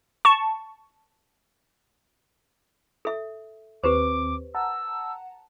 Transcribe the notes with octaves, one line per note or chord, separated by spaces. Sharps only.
A5 C#6
A4 E5
D#2 C4 G4 B4 C5 D6
F#5 A5 A#5 E6